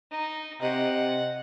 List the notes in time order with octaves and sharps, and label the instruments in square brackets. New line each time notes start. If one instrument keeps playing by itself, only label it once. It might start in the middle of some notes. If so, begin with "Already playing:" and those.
[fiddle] D#4
[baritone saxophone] C3 [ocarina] D#5 [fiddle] F#5